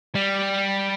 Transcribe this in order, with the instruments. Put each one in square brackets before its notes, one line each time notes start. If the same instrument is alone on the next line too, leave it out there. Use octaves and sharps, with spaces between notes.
[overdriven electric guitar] G3